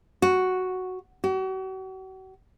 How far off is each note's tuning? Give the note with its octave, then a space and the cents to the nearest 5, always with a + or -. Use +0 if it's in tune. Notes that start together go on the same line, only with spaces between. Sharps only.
F#4 +0
F#4 +40